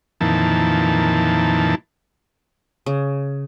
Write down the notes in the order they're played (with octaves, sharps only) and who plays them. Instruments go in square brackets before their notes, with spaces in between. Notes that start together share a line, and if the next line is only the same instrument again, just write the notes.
[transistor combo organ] F2 A#2 D#3 E3 A5
[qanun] C#3